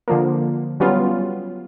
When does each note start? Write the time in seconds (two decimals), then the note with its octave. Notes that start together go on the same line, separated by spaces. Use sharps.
0.08 D3 F3 A#3
0.80 F#3 G3 B3 C#4 F4